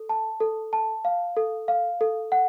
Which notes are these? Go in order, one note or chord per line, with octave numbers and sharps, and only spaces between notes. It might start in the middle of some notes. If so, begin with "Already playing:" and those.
Already playing: A4
A5
A4
A5
F5
A4
F5
A4
F#5